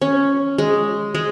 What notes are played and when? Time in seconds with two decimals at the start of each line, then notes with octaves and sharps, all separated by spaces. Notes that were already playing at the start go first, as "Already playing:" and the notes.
0.01 C#4
0.58 G#3
1.15 G#3